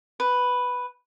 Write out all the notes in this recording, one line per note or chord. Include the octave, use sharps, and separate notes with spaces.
B4